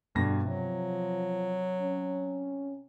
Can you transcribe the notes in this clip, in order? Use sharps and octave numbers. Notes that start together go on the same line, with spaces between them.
G2 B2 D3 A#6
C3 F3 F#3
C#4